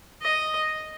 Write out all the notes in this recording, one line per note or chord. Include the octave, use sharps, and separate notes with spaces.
D#5